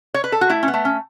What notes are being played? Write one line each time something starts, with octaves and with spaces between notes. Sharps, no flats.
C#5
B4
A4
F#4
A3 E4
C#4
B3
A3
C#4